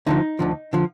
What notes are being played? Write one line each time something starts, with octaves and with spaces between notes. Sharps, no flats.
D2 D3 F3 D#4
D2 D3 F3
D3 F3